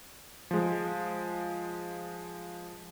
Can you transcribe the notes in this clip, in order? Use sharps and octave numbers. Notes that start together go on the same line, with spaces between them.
F3 G#3